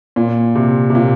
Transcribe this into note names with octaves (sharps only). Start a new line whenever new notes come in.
A#2
C3
C3
A#2